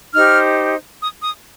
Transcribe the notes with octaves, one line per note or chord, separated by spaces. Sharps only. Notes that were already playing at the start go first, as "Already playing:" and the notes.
D#4 G4 C5 F6
D#6
D#6